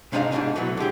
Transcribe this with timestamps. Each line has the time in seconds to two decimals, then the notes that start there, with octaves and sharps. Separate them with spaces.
0.12 G#2 C3 D4 D#4 A#4 F5
0.31 G#2 B2 E3 G3 D4 D#4
0.56 B2 E3 F#3 A3
0.77 D3 G#3 G4 G#4